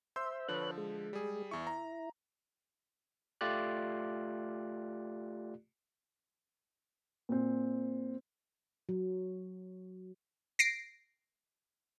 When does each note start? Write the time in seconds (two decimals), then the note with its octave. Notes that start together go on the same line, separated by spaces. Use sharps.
0.16 C5 E5 C6 E6 G6
0.48 D3 F3 B4 C#5 F#6
0.78 G#3
1.13 G3 G#4
1.51 E2 E4 C#6
1.67 A#5
3.41 A3 F4 G4 D5 F#6
7.29 A#2 C4
8.89 F#3
10.59 A#6 C7 D7